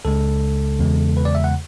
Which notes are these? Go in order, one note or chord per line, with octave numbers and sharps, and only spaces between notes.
C#2 C#3 G#3 A4
E2 C#3 G#3
B4
D5
E5
F#5